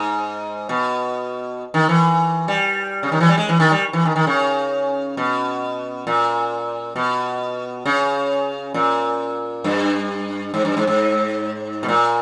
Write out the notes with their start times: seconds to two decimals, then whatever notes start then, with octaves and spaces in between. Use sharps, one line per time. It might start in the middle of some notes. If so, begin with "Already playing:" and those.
Already playing: G#2
0.69 B2
1.74 D#3
1.89 E3
2.48 G3
3.03 C#3
3.12 D#3
3.21 E3
3.29 G3
3.37 G#3
3.49 E3
3.60 D#3
3.71 G3
3.93 E3
4.05 D#3
4.16 D#3
4.27 C#3
5.17 B2
6.07 A#2
6.96 B2
7.85 C#3
8.74 A#2
9.64 G2
10.54 G#2
10.65 G2
10.77 G#2
10.87 G#2
11.83 B2
11.88 A#2